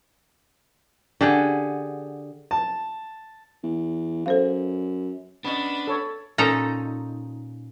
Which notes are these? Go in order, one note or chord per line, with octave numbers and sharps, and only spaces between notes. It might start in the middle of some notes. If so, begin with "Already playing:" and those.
D3 G4 G#4 F#5
A5
E2
F#2 A4 C5 F5
B3 C#4 D4 D#5 B5
A4 C#5
A#2 C#4 D#4 A4 A#5